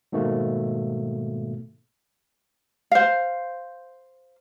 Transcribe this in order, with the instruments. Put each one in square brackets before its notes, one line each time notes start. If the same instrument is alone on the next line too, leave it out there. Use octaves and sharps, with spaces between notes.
[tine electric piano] G#2 B2 D#3 A3 A#3
[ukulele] C5 F5